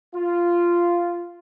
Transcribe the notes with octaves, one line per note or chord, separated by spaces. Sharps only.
F4